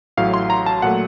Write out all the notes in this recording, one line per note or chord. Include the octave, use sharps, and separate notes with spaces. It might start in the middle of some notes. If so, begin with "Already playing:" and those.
A1 A2 F#3 F5
C6
A#5
A5
A#2 F#3 A3 F#5